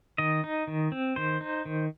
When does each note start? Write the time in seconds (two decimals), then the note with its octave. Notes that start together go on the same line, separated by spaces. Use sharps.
0.18 D#3 D#5
0.44 D#4
0.67 D#3
0.92 C4
1.16 D#3 C5
1.41 D#4
1.65 D#3